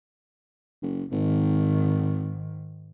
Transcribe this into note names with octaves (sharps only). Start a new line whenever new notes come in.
F#1
G#1 G#2 D#3